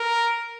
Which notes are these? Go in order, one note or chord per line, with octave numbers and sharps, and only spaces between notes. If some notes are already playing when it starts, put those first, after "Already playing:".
Already playing: A#4